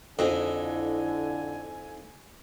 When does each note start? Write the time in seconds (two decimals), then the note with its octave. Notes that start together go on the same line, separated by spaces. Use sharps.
0.19 F2 D3 D#4 E4 G#4 G#5